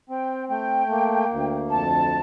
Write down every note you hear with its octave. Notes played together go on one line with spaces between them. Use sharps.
C4 G5
A3 G5
A#3
D2
F2 A5